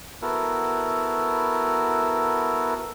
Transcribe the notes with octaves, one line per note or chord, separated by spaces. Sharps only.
B3 E4 F#4 A4 A#4